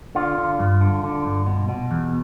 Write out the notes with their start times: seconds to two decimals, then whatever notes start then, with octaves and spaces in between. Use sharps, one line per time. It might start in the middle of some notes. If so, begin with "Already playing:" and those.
0.15 D3 F4
0.38 D3
0.59 G2
0.81 D3
1.03 D3
1.25 G2
1.46 B2
1.69 B2
1.91 E2